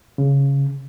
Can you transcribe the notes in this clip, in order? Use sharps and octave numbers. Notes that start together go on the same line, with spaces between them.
C#3